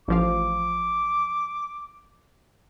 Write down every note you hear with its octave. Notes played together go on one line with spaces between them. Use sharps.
A1 F3 F5 D6